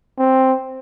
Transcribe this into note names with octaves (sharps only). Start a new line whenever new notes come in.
C4